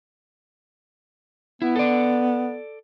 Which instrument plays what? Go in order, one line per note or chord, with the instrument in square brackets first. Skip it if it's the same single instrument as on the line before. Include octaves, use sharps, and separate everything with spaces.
[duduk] B3 [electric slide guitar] E4
[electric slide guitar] A4 D5